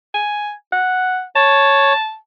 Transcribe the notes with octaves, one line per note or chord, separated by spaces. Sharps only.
G#5
F#5
C#5 A5